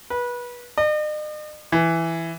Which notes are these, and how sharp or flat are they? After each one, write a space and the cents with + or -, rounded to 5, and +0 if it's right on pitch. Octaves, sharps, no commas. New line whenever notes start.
B4 -25
D#5 -45
E3 +5